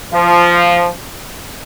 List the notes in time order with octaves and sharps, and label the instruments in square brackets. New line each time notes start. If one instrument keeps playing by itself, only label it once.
[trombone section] F3